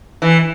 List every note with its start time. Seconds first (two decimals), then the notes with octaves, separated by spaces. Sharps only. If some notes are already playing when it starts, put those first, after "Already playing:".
0.22 E3